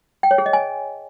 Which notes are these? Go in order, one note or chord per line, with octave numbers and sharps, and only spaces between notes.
G5
C#5
G#4
D#5
G#5